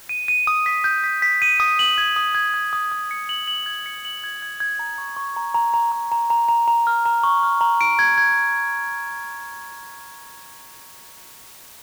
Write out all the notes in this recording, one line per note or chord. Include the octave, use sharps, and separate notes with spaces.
D#7
D#7
D#6
B6
G6
B6
B6
D#7
D#6
F#7
G#6
D#6
G#6
G#6
D#6
D#6
C#7
F#7
F#7
G#6
C#7
F#7
G#6
G#6
G#6
A#5
C#6
C#6
A#5
A#5
A#5
A#5
A#5
A#5
A#5
A#5
F6
A#5
C#6
F6
A#5
D7
G#6
G#6